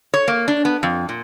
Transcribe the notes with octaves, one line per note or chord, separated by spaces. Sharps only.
C#5
A#3
D4
B3
F2
A#2